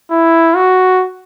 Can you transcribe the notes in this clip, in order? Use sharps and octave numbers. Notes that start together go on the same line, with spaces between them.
E4
F#4